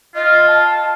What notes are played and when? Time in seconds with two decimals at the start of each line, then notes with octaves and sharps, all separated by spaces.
0.15 F4 D#5
0.47 A5